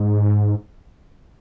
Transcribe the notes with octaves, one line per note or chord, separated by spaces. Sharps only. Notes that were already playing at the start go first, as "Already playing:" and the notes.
Already playing: G#2